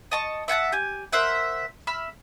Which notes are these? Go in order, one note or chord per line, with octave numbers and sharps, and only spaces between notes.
D#5 A5 C#6
E5 F#5 G#5 A5
G4 G#5
A#4 C5 E5 F#5
E5 B5 F6